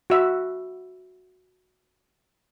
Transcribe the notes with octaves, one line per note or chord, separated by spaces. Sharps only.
F#4 E5